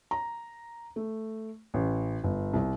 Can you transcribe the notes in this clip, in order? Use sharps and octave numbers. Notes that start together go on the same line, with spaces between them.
A#5
A3
A1
G1
C2